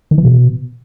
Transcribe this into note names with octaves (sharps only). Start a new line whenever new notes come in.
D#3
E3
B2